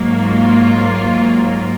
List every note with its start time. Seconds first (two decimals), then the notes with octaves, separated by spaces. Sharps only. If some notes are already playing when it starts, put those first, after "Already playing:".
Already playing: G#2 F#3 A#3
0.22 F4